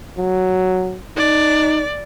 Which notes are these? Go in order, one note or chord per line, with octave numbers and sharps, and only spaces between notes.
F#3
D#4 D5